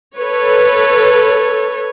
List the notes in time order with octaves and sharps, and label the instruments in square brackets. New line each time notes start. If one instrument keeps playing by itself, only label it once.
[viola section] A4 B4 C#5